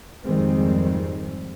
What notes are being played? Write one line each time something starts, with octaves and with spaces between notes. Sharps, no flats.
G#1 F2 D#3 G3 G#3 C4